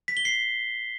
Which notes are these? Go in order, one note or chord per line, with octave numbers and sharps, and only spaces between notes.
B6
G7
C7